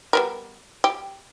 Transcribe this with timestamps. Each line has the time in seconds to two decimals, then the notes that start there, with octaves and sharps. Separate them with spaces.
0.13 G3 B3 A#4
0.84 G4